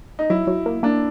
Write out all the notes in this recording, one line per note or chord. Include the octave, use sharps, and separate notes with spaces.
D#4
F#3 E4
F#3
A#3
A#3 D4